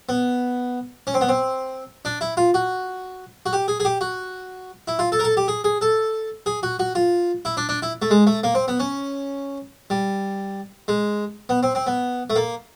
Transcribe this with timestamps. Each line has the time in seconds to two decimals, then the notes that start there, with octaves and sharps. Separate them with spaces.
0.09 B3
1.07 C#4
1.14 C4
1.21 B3
1.29 C4
2.05 D4
2.21 E4
2.37 F4
2.54 F#4
3.46 F#4
3.53 G4
3.68 G#4
3.80 G#4
3.85 G4
4.01 F#4
4.88 E4
4.99 F4
5.12 A4
5.19 A#4
5.24 A4
5.37 G4
5.48 G#4
5.64 G#4
5.81 A4
6.46 G#4
6.63 F#4
6.79 F#4
6.95 F4
7.45 E4
7.57 D4
7.69 D4
7.82 E4
8.02 A3
8.11 G#3
8.27 A3
8.44 A#3
8.55 C4
8.68 B3
8.80 C#4
9.90 G3
10.88 G#3
11.49 B3
11.63 C4
11.75 C4
11.87 B3
12.30 A3
12.36 A#3